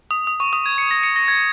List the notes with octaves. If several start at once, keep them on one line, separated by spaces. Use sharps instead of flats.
D#6
D#6
C#6
D#6
G#6
C#7
A#6
C#7
A#6
G#6